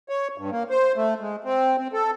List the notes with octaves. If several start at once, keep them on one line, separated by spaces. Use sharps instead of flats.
C#5
G2
A#3
C5
A3
G#3
C4
C4
A4